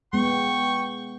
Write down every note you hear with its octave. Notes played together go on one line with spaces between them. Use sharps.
G#3 B3 G5 C#6